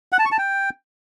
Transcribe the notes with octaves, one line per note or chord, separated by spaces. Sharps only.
F#5
A5
C#6
A5
G5